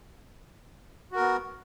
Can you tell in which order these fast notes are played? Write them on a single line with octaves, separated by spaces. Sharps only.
F#4 A#4 B3